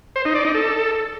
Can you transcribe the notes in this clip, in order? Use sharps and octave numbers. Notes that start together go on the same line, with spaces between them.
C5
D#4
D5
D#4
A4